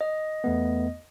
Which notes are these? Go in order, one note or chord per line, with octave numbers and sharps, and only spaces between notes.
D#5
E2 A3 B3